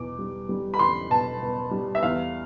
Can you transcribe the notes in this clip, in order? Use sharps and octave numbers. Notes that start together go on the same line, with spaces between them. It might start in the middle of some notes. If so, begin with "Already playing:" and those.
Already playing: E2 B2 D6
G3
G3
B5
E2 C6
B2 A5
B2
G3
E5
E2 F5